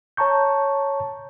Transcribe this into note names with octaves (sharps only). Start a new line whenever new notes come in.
C#5 A5 A#5 C#6 G6